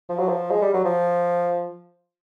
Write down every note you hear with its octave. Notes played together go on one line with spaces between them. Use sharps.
F3
F#3
F3
G#3
G3
F#3
F3